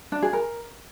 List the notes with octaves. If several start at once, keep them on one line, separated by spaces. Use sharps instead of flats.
D4
G#4
A#4